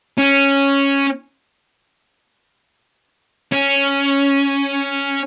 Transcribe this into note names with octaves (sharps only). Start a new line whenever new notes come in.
C#4
C#4